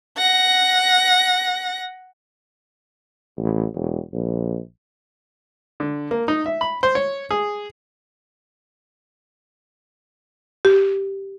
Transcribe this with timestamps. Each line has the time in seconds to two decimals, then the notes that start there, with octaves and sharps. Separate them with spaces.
0.18 F#5 A#6
3.38 A1
3.76 E1
4.13 A#1
5.80 D3
6.11 A#3
6.28 D#4
6.46 E5
6.61 B5
6.83 C5
6.95 C#5
7.31 G#4
10.65 G4